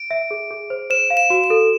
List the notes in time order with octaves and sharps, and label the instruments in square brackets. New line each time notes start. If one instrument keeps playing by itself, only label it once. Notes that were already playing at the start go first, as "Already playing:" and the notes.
Already playing: [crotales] D7
[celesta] E5
G#4
G#4
C5
[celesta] C5 [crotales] E7
[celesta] F5
[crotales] E7
[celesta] F#4
[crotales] E7
[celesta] A4